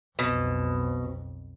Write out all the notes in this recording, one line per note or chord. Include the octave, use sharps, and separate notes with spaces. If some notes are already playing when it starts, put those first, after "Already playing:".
B1 F2 B2